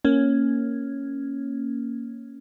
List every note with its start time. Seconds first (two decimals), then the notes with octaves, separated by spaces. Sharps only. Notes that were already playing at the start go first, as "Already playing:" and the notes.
0.05 A#3 C#4